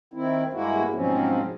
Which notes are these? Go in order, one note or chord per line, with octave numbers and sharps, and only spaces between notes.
D#3 C4 E4
G2 G#3 A#3 E4 F#4
G#2 B2 F3 F#3 C4 C#4